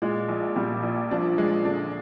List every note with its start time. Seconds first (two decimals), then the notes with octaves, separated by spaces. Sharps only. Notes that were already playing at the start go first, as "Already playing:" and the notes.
0.02 A#2 G#3
0.28 A#1
0.56 A#2 G3
0.83 A#1
1.11 F3 D4
1.38 G#3
1.65 D3 D4